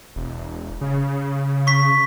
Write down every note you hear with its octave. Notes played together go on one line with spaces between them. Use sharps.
E1
C#3
C#6 B6